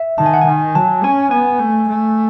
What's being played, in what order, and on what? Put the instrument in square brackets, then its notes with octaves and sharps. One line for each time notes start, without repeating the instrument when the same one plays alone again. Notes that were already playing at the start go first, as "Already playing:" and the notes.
Already playing: [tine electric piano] E5
[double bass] D#3 [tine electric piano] A5
[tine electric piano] G#5
F#5
G#5
[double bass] D#3
[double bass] F#3 [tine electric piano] A5
[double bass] C#4 [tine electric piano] G#5
[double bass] B3 [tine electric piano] G#5
[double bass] A3
A3